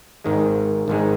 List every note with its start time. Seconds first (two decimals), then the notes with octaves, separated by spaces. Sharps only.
0.24 G#1 G#2 D#3 G#3
0.88 G#1 G#2 D#3 G#3